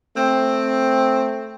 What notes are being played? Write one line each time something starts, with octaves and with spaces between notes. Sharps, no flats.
A3 C4